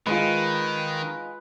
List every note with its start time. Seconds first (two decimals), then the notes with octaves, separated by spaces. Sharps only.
0.06 D#3 G#3 D#4 F4 B4